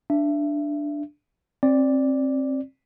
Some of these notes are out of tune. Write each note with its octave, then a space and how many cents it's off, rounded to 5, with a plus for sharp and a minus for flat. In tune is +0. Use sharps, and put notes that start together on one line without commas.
D4 +0 E5 +25
C4 +30 D5 +0